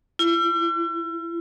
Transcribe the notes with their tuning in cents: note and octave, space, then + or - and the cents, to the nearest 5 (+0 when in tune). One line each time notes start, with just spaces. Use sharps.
E4 +40